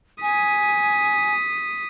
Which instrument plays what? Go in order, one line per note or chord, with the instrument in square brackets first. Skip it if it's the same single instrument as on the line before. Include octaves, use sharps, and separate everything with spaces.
[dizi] G#5 [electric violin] D#6 B6